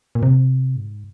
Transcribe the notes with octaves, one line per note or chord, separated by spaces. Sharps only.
A#2
C3
G#2